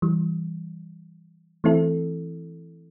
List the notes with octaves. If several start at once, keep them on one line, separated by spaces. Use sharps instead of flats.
E3 G3
E3 A3 C4 E4 A4